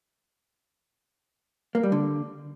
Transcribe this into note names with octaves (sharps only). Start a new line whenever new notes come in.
A#3
G3
D3